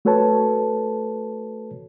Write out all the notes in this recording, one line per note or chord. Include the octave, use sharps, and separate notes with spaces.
A3 F#4 A4 B4 C#5 A5